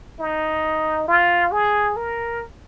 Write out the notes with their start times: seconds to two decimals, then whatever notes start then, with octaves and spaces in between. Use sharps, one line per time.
0.19 D#4
1.08 F4
1.52 G#4
1.96 A#4